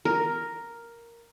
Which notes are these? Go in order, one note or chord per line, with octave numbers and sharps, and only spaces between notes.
A#4